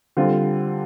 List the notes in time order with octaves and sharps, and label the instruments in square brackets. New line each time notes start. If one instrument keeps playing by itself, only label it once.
[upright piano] D3 G3 C4 F4